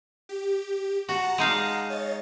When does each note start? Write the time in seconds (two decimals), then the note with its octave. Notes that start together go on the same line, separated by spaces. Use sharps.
0.29 G4
1.09 F#4 F#5 A5 A#5
1.38 G#3 D#4 F5
1.90 C#5 D#5 A6